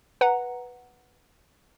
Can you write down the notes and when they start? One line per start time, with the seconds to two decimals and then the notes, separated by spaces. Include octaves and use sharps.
0.21 B4 F#5 A#5